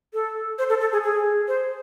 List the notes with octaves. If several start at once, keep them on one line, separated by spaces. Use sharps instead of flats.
A4
C5
A4
A4
G#4
G#4
C5